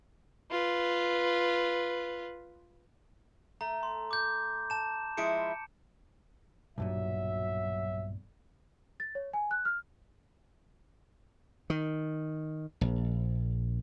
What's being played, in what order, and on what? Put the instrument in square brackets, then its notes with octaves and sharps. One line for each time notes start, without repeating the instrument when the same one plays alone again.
[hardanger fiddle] F4 B4
[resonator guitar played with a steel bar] A3 [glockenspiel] A#5
[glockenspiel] C6
D6 G6
A5 E7
[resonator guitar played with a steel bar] F3 G#3 E4 [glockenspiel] C#7 D7
[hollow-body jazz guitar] B1 G2 A#2 [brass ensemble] F#3 E5
[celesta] A6
C#5
G#5
F#6
F6
[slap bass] D#3
A#1